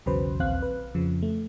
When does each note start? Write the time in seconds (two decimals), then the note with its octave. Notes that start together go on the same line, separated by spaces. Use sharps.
0.06 B1 E2 C#3 F#3 B4 C5
0.40 A#1 D#2 C4 F5 F#6
0.62 B4
0.94 F2 C#3 F3
1.22 A3